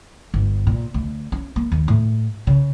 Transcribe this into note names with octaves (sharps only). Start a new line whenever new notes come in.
G1
A#2
D2
C#4
A#3
D#2
A2
C#3